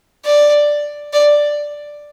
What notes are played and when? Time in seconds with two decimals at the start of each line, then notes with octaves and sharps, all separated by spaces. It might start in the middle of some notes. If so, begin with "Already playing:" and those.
0.25 D5
1.13 D5